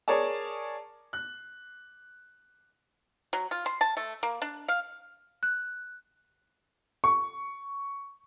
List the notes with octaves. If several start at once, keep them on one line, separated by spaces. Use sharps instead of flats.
G#4 A#4 C#5 D5 A5
F#6
F#3
F4
C6
A5
A3
A#3
D4
F5
F#6
C#6